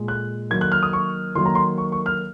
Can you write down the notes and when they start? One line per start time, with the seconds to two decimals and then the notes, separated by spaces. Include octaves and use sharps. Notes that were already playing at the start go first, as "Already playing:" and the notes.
Already playing: A#2 G#3
0.08 F#6
0.50 D#3 F#3 A#3 G#6
0.61 F#6
0.72 F6
0.83 D#6
0.93 C#6
1.35 D#3 F#3 A#3 C6
1.45 A#5
1.55 C6
1.78 C#6
1.92 C#6
2.06 F6